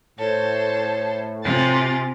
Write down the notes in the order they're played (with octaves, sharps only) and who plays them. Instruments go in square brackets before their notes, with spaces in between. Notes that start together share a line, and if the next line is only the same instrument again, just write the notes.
[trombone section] A2 [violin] A4 C5 [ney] C#5
[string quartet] C3 [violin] F4 A6 [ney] G#5